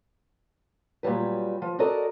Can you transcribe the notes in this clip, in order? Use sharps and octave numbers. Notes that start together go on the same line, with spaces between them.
A#2 F#3 G3 B4
F3
F#4 A4 A#4 D5 D#5